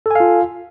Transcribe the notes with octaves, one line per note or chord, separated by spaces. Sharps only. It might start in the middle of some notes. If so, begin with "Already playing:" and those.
F4 A4 F5 G#5